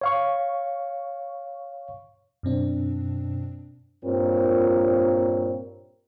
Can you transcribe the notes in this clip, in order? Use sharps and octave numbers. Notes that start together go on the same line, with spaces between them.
C#5 F5 C#6
F#2 B2 C4 D4
G2 A#2 C4 F4 A#4 C#5